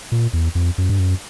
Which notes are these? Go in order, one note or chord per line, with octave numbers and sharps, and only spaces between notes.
A#2
E2
F2
F#2
G2
F#2